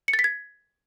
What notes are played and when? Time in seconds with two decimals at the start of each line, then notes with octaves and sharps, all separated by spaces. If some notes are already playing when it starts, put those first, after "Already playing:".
0.08 C#7
0.13 A6
0.19 B6
0.24 G#6